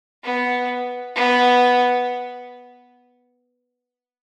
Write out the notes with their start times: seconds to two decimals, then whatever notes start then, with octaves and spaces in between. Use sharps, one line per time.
0.24 B3
1.16 B3